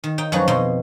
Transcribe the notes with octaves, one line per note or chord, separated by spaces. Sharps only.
D#3
D#4 G5
F#2 F3 F#3 D#4 B4
F2 B2 D#4 D#5 C6